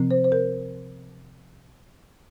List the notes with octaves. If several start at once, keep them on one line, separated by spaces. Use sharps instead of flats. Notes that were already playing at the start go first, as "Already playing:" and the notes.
Already playing: C3 F3 C4
C5
C5
A#4